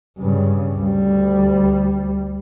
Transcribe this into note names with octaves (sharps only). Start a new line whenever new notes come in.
G2 C#3
D2 G3